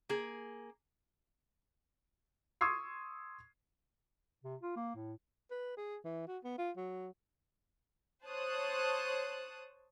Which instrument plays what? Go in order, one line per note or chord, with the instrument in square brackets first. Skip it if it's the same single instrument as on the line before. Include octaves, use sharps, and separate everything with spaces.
[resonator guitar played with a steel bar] A#3 G#4
[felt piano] C6 C#6 D#6 E6 G#6 C7
[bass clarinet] C3
F4
A#3
A2
[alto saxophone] B4
G#4
E3
F#4
B3
F4
F#3
[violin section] C5 C#5 A5 D#6 F#6